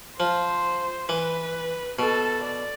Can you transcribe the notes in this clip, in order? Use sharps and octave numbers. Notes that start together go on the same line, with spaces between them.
F3 C5
E3 B4
B2 A4
D5